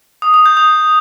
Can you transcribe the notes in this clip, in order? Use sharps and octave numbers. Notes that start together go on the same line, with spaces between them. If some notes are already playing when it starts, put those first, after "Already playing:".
D#6
D#6
G6
D#6